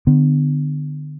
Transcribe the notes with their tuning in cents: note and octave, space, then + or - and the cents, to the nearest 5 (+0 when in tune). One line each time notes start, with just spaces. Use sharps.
D3 +25 B3 +20